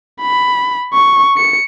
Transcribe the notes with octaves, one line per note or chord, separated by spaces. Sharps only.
B5
C#6
C#7